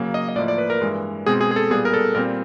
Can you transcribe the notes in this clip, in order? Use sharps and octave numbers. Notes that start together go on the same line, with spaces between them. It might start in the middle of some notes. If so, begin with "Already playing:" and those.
Already playing: C#3 F#3 A#3
D#5
D#5
A2 F3 A#3 D5
D5
B4
A#4
G2 E3 G#3
B2 G#3 C4 G#4
G#4
G#4
A4
A#2 G3 B3 G#4
A#4
A4
A#2 G3 C4 A#4